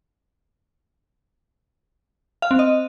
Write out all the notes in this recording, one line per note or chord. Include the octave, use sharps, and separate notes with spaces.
F5
C4
D#5